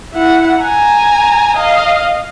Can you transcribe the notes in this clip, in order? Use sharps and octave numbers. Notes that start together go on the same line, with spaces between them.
E4 F#5
G#5 A#5
D#5 F5